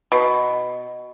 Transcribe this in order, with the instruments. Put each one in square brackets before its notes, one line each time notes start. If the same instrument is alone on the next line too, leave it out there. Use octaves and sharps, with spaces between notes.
[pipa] B2